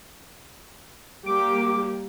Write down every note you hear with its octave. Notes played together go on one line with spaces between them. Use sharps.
G3 A#3 G4 D6